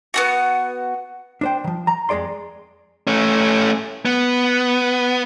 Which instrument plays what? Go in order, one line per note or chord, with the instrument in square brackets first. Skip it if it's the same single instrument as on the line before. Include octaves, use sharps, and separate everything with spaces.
[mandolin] B3 C4 F#4
[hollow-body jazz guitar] D4 C5 G5
D#3 F3
A#5
F2 G#3 G#4 D5 C6
[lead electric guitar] A3 C#4
B3